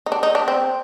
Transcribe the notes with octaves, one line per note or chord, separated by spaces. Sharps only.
D#4
D4
D#4
D4
C4